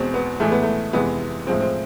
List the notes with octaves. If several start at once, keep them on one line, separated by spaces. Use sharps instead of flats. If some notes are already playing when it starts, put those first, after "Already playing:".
Already playing: E2 B2 G#3 C4
B3
A2 E3 G#3 A3
B3
A3
F2 C3 E3 G#3 B3
A2 F3 G#3 C4
C4